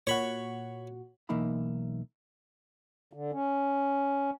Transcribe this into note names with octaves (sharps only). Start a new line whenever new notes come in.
A#2 F#4 C#5 B5
B1 E3 A#3 D#4 E4 B5
D3
C#4